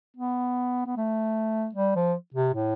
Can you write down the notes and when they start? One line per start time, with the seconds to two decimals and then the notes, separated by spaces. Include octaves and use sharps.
0.17 B3
0.86 B3
0.97 A3
1.75 G3
1.96 F3
2.35 C3
2.54 A2